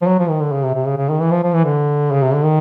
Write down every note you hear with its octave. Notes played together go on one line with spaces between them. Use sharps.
F3
F#3
F3
D#3
D3
C#3
C3
C3
C#3
C#3
D#3
E3
F3
F3
E3
D3
C#3
C3
D3
D#3